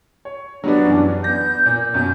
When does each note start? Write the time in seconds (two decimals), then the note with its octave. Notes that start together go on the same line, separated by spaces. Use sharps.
0.25 C#5
0.64 F#3 G3 B3 D4
0.85 F#2 E3
1.24 B3 G6 A#6
1.66 A#2
1.94 F#2 B2 G6